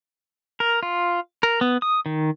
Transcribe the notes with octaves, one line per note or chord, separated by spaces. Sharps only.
A#4
F4
A#4
B3
D#6
D#3